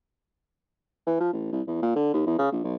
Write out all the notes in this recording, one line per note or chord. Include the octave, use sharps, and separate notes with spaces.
E3
F3
A1
C2
E2
A#2
D3
D#2
E2
C#3
A#1
B1